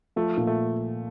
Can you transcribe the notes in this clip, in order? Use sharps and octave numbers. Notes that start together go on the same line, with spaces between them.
F3 A3
A#2
A3